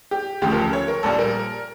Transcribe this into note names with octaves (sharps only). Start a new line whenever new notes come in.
G4
D2 C#3 F3 G4
A#4
A4
C#5
A#4
A#1 A#2 G3 A4
A#4